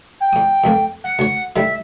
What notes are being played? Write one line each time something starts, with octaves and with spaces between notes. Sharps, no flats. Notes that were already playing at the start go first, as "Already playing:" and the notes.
G5
E2 D#6
F2 A3 A#3
F#5
D2 C#5
A2 D#3 G3 E5